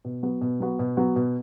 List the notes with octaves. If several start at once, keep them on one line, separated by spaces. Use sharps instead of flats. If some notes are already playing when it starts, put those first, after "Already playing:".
B2
F#3 B3 F#4
B2
F#3 B3 F#4
B2
F#3 B3 F#4
B2